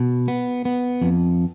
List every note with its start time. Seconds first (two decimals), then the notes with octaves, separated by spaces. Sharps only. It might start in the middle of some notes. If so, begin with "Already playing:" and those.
Already playing: B2
0.28 B3
0.65 B3
1.01 F2